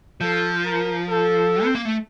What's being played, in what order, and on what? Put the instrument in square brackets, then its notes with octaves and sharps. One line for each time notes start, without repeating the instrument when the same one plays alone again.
[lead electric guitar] F3 [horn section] A4
[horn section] A#4
A4
[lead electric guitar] C4
A#3
A3